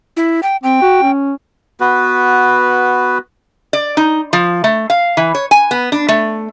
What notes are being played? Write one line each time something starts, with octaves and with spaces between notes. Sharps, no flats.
E4
G5
C4 G5
F#4
C#4
B3 F#4 B4
D5
D#4
F3
A3
F5
E3
C#5
G#5
B3
D4
A3